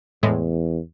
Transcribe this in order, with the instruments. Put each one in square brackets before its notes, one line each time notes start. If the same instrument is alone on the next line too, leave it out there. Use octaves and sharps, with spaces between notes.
[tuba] E2 [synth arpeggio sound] A2 G#3